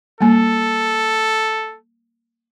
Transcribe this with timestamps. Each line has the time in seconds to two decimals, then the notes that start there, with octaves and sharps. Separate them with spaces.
0.21 G3 A#3 A4